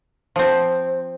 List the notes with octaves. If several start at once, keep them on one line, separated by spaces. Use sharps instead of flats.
F3 C4